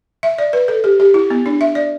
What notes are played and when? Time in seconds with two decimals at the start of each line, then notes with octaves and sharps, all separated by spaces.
0.23 E5
0.38 D5
0.53 B4
0.68 A4
0.84 G4
1.00 G4
1.14 E4
1.30 B3
1.46 D4
1.61 E5
1.75 D5